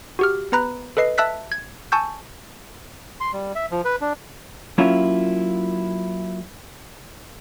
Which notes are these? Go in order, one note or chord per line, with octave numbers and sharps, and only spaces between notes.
F#4 G4 F6
B3 B4 A#5 B5 F#6
A4 B4 D#5 C7
E5 A5 E6 F#6 B6
G#6
G#5 A5 C#6 E6 G6
C6
G3
E5
F3
B4
D4
F#3 A#3 C#4 E4 F4